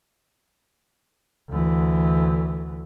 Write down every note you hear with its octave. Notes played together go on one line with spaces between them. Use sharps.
D2 E3